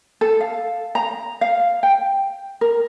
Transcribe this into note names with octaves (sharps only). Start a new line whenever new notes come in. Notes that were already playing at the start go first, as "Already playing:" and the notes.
A4
F5
A#5
F5
G5
A#4